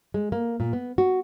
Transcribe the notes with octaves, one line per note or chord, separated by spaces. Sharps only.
G#3
A#3
A#2
B3
F#4